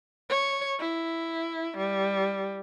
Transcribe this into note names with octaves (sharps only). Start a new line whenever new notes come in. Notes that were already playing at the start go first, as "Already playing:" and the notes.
C#5
E4
G3